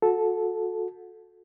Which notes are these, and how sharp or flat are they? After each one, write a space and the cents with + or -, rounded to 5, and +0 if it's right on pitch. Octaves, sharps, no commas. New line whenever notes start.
F#4 -30 A4 -10